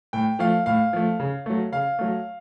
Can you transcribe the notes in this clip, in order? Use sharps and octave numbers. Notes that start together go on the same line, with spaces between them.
A2 G5
F3 A3 F5
A2 F5
F3 A3
C#3
F#3 A3
C#3 F5
F#3 A3